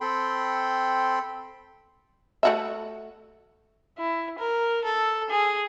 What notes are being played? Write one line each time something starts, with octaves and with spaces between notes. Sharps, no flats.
C4 A4 G5 B5 C6
A3 F#4 E5
E4
A#4
A4
G#4